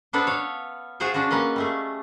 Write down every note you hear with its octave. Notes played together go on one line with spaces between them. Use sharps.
B3 D4 A4 B4 C5
C#5 F5
F4 F#4 G#4 C5 G5 G#5
C#4 D4 F4 F#4 G#4
A#3 C#4 B4 D#5
G3 A3 G#4